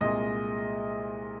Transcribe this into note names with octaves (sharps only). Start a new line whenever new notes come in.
C2 A#2 G#3 D#5